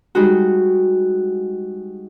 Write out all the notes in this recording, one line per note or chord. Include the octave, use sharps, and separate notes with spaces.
G3 G#3 D#4 F#4